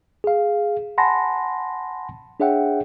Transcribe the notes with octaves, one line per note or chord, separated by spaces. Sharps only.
G#4 F5
F#5 G#5 A5 B5 C6 A#6
D4 G#4 C#5 E5 F#5 G5